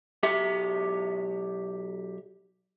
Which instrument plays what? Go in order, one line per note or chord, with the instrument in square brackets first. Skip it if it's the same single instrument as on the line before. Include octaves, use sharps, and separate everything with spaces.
[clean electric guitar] B1 G4 E5